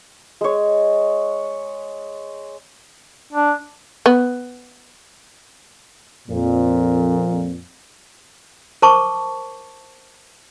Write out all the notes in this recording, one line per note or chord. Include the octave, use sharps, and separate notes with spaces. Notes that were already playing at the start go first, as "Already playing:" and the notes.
G#3 C#5
D4
B3
F2 A#2
A#4 C5 A5 C#6 D6